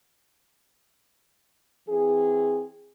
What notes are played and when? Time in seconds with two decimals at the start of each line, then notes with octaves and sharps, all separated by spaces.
1.89 E3 C4 G#4